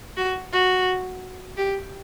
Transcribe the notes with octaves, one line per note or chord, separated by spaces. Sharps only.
F#4
F#4
G4